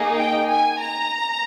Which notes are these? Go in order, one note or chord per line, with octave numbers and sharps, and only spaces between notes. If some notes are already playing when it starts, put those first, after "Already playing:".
Already playing: A#3 D#4 G#4
G5
G#5
A#5